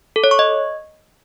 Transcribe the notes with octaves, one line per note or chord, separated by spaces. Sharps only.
A4
C#5
C#6
D#5